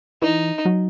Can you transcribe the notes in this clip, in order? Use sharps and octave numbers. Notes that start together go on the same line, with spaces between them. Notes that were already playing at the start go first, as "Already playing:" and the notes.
E3 D#4
F#3